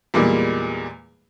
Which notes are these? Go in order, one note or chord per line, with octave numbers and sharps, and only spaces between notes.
E2 A#2 G3 G#3 A#3